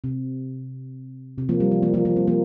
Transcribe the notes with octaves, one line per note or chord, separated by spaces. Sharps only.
C3
C3
F3 A#3
G3
F3
F3 A#3
F3 A#3
F3 A#3
G3 C4
F3 A#3